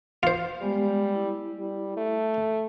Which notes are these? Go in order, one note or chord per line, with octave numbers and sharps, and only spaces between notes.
F4 C5
G3 G#3 B3 G4
E4
G3
A3